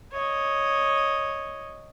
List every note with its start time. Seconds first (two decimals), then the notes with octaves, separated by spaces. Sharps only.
0.12 C#5 D#5